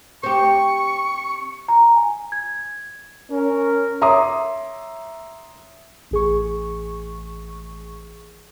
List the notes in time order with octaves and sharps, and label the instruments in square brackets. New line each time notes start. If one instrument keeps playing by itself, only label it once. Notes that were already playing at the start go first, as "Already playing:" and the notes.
[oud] C4 G4 [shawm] C#6
[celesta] A#5
G#5
G#6
[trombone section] C#4 A#4
[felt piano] C#5 E5 A#5 C6 D6 D#6
[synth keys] A1 G#4 C#6